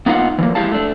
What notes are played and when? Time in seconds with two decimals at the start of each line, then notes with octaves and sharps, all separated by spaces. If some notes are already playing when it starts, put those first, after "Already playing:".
0.06 A#3 B3 D#4 F4 F5 F#5
0.38 E3 F3 A#3
0.55 G#3 E4 G4 F5 A5
0.71 A3 D4